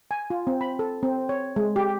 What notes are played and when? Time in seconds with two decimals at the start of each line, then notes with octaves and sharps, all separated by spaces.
0.11 G#5
0.30 F4
0.47 C4
0.61 B5
0.79 A4
1.03 C4
1.29 C#5
1.56 G#3
1.76 G4